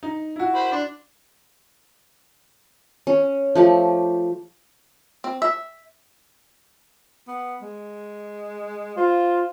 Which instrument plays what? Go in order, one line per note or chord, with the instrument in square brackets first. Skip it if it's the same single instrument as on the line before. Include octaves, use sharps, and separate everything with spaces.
[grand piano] D#4
E4 F#4
[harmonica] C5 B5
[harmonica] D4 [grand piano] C6
[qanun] C#4
F3 A3 G4
[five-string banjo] C4
E5
[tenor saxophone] B3
G#3
[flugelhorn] F4 [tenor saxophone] C5